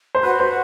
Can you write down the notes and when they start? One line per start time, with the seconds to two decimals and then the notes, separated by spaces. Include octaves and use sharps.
0.15 C5
0.23 F#4 B4
0.40 C5